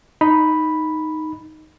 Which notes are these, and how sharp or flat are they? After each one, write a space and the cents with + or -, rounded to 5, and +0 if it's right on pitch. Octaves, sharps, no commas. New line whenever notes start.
D#4 +0 B5 +0